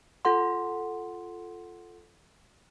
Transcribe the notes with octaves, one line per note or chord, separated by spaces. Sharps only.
F4 A4 F#5 C6